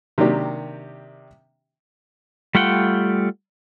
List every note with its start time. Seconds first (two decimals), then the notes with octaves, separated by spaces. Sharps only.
0.18 C3 D#3 F#3 A#3 D4 G4
2.55 G3 A3 F4 F#5 G5